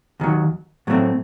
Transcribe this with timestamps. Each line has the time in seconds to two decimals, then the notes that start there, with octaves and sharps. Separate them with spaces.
0.20 D#2 D#3 F#3
0.87 A2 F#3 A3 C4